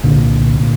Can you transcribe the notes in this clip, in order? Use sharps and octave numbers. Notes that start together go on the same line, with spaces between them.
C2 A#2 D3
A#2